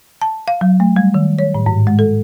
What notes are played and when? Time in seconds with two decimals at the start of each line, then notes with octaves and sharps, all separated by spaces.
0.21 A5
0.48 F5
0.61 F#3
0.80 A3
0.96 G3
1.14 D#3
1.39 C#5
1.55 A2
1.66 G#2
1.87 G#3
1.99 A4